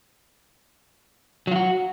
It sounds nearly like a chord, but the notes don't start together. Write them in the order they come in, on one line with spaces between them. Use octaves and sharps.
F#3 F4 F#4